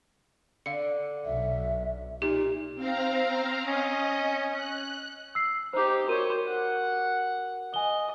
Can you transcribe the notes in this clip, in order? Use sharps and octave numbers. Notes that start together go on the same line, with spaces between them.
D3 F5 C#7
B1 E5
A#2 D#4 G4
C4 F5 A#5
C#4 D#5
F#6
E6 C7
D#4 G4 C5
F#4 A#4 C5 C#5 D#7
F#5
D#5 G#5 G7